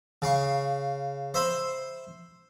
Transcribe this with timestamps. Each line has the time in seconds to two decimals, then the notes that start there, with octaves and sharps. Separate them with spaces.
0.22 C#3 F5 C#6
1.34 C5 E5 B5 C6